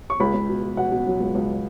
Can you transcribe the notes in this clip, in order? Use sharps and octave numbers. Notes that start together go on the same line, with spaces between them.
C#6
C#2 B5
C#2
B2
B2
B2 F#5
B2
F#3
C#2
C#2